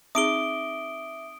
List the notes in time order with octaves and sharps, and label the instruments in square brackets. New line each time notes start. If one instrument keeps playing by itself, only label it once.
[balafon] C4 D#4 G#4 [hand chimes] E5 D6 [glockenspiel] D#6 D7 G7